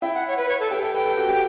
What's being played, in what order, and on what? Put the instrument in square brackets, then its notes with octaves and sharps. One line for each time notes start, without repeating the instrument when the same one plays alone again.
[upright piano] E4 [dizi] G5
[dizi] F#5
C#5
B4
C#5
A4
[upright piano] G4 [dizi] G5
[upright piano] A4 [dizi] G5
[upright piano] B4 [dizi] G5
[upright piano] A4
F#4
G4